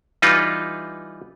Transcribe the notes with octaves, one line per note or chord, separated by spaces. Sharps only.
E3 G3 D#4 F4 B4